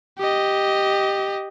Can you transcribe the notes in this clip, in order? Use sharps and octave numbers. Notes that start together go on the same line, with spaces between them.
G4 D#5